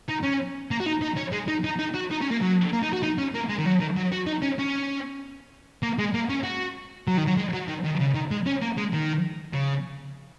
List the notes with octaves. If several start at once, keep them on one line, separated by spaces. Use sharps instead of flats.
D#4
C#4
A#3
F#4
D#4
D#4
C#4
G#3
D#4
D#4
D#4
F#4
D#4
C#4
A#3
F#3
A#3
D#4
F#4
D#4
C#4
A#3
G#3
D#3
F#3
D#3
F#3
F#4
D#4
C#4
C#4
A#3
G#3
A#3
C#4
F#4
F#3
D#3
F#3
G#3
F#3
D#3
D#3
C#3
D#3
G#3
C#4
A#3
G#3
D#3
C#3